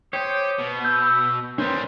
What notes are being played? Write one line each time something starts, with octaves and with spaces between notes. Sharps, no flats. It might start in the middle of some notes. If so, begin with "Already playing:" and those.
G4 C5 C#5 D#6
B2 B3
E6 G6
D#3 G3 C#4 B4 C5